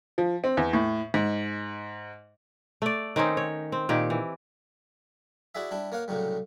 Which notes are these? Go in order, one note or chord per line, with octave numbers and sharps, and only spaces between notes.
F3
C4
E2
A2
G#2
A3 D5
D#3 C4 C#4 D#4
C#5
C4
A#2 D#3 G4
E3
E4 F#4 G#4 D5 E5
G3 D4 E4
A#3 C#5 F5 F#5
C2 A2 C#3 F#3 G3